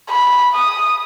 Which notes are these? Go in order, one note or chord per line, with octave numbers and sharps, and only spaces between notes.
B5
D#6